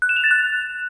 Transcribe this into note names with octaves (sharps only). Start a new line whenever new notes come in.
F#6
E7
F7
A6
F#6